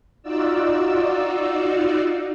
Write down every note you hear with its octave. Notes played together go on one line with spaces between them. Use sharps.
D#4 F4 F#4 D5 E6